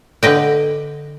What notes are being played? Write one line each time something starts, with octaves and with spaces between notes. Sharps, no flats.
D3 B4 D#5 G5